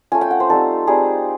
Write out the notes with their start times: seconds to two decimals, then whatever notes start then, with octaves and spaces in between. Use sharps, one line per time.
0.12 A3 C#4 F4 G#5
0.21 G5
0.31 F#5
0.40 C5
0.50 G3 C4 D#4 A4
0.87 G3 C4 D#4 G#4